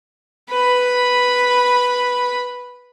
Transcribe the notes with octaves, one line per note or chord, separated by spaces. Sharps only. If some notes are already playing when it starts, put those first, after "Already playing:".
B4 B5